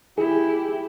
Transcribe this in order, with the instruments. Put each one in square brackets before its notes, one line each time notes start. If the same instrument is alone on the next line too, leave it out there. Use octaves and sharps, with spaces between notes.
[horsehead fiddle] E4 G4 [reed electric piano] G#4